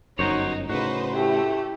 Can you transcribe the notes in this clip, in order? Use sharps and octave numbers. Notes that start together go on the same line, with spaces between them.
G1 F#2 D#4 F#4 C5 C#5
A2 C#3 D#4 F#4 B4 C5
A3 E4 G4